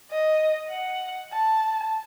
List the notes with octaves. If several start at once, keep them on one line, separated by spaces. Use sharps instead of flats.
D#5
F#5
A5